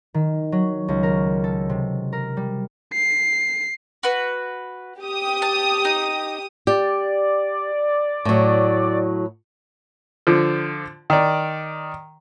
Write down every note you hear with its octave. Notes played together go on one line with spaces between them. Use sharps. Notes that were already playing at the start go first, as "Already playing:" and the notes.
D#3
F#3
C#2
A#4
A4
C3
A#4
G3
C7
F#4 B4
G4 D#6
A5
D#4
G4 D5
A2 F#3
D3 F3
D#3 D5